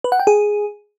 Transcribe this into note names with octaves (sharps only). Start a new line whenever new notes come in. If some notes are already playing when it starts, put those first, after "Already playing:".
B4
F#5
G5
G#4